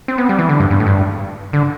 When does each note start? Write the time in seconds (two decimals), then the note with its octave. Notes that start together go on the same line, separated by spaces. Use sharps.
0.08 C4
0.18 B3
0.29 G3
0.39 E3
0.49 D3
0.60 G2
0.70 G2
0.80 A2
0.86 G2
1.53 D3